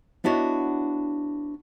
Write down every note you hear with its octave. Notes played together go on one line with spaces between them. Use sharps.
B3 D4 E4 F#4 C#5 D#5